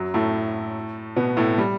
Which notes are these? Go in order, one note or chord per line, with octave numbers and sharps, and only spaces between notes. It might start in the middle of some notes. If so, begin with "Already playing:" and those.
Already playing: F#2 F#3
A2 A3
B2 B3
A2 A3
G3